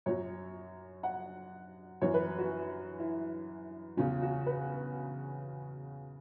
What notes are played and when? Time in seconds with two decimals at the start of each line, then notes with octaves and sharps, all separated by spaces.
0.06 F#2 F#3 C#5
1.03 F#5
2.01 F#2 E3 C#5
2.14 B4
2.39 F#4
3.00 E4
3.97 E2 C#3 F#3 C#4
4.22 F#4
4.46 B4